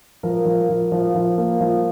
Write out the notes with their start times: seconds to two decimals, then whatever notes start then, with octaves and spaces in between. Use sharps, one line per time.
0.23 F3 A#4
0.45 F3
0.69 F3
0.92 F3
1.15 F3
1.38 A#3
1.61 F3